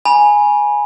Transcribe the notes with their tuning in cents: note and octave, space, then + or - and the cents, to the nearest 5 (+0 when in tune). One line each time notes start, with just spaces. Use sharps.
G#5 +0 B5 -30